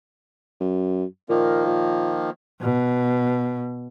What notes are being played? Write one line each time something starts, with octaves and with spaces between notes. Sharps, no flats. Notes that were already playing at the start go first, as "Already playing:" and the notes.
F#2
A#2 D#3 F3 A#3
A#2
B2